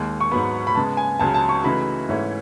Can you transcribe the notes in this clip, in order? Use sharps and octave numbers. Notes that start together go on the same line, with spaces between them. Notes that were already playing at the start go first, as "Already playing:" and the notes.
Already playing: D#2 D#3 G#3
C#6
G#2 F#3 B3 B5
B5
C#3 G#3 B3 A5
G#5
C#2 C#3 F#3 A5
A5
C#6
C#3 E3 A3 D#4 F#4 B5
G#2 E3 A3 C#4 E4